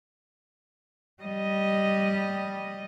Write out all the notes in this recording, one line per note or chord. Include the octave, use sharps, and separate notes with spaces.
G3 D#5